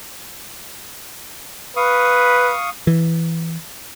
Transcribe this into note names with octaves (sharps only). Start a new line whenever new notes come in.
B4 F5 C#6 D#6
E3